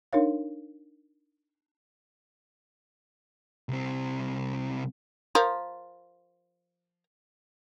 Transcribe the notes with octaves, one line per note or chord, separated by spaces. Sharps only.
D4 D#4 A#4 C#5 F5
C2 C4
F3 A#4